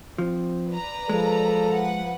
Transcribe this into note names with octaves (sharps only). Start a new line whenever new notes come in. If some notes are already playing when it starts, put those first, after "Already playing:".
F3 C4
B4 D5 A#5
F3 G#3 A4
B4 F#5